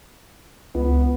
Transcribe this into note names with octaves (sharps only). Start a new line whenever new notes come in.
C#2 B3